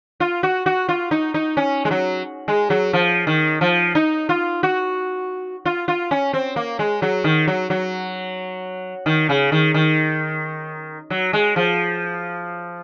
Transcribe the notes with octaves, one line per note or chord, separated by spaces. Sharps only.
F4
F#4
F#4
F4
D#4
D#4
C#4
G#3
F#3
G#3
F#3
F3
D#3
F3
D#4
F4
F#4
F4
F4
C#4
C4
A#3
G#3
F#3
D#3
F#3
F#3
D#3
C#3
D#3
D#3
F#3
G#3
F3